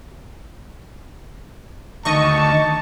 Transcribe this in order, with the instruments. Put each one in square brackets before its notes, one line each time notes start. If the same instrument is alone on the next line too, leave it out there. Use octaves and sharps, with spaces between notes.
[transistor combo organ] D2 D#3 [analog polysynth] D#5 C#6 [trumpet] A5